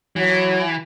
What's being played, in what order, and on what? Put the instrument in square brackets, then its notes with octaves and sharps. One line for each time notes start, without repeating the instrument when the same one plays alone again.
[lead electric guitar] E3 [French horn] F#3